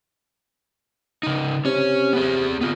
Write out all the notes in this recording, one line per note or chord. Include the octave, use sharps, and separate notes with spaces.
C#3 D#4
C3 C#4 C#5
B3 G#4
B3 F4